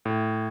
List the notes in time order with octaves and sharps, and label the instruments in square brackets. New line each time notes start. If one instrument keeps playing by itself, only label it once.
[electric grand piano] A2